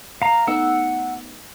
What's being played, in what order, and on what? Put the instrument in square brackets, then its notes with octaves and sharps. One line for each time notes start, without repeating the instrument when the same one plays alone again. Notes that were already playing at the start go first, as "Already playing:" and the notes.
[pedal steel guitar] F5 A#5
[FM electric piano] A3 B3 D#4 [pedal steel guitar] F#5 E6